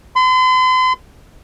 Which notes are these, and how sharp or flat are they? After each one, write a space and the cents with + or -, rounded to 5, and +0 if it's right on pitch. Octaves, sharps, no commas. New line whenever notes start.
C6 -45